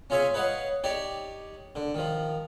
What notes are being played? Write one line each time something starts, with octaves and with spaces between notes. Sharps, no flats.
C#4 F4 G#4 C#5 E5 G#5
B4 C#5 D#5 F5 F#5
D#4 G4 C#5 D5
D3
D#3 F3